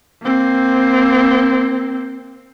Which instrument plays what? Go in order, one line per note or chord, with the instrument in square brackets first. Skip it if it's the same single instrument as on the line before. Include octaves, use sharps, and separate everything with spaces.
[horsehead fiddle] A#3 C4